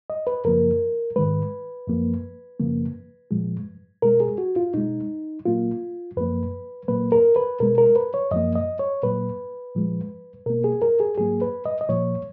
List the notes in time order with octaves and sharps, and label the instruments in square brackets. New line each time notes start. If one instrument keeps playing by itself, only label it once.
[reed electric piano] D#5
B4
F#2 C#3 F3 A#3 A#4
G#2 D#3 G#3 B4
F#2 F3 A#3
F#2 C#3 F3 A#3
A#2 F3 G#3
B2 G#3 A#4
G#4
F#4
F4
B2 G#3 D#4
A#2 F#3 A#3 F4
F#2 F3 A#3 B4
A#2 F#3 A#3 B4
A#4
B4
B2 G#3 A#4
A#4
B4
C#5
F#2 F3 A#3 D#5
D#5
C#5
A#2 F#3 A#3 B4
A#2 F3 G#3
B2 A#3 A#4
G#4
A#4
G#4
G#2 F#3 A#3 G#4
B4
D#5
D#5
A#2 F3 A#3 C#5